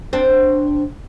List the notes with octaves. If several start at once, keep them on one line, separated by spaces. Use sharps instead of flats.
C4 D4